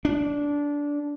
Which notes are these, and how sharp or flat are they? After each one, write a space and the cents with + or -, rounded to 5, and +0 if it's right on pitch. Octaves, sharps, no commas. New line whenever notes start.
D4 -15